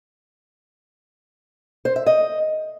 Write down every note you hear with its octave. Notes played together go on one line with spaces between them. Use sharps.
C5
E5
D#5